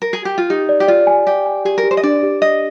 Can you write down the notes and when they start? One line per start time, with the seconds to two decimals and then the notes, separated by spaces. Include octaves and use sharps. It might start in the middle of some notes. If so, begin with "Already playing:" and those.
0.02 A#4
0.13 G#4
0.25 G4
0.38 F4
0.50 D#4 G4
0.69 D5
0.80 G4
0.88 F4 D5
1.07 G#5
1.27 G4 D5
1.46 G#5
1.65 G4 G#4
1.78 A#4
1.84 G4
1.91 C5
1.97 D#5
2.03 D4 D5
2.23 G4
2.41 D5 D#5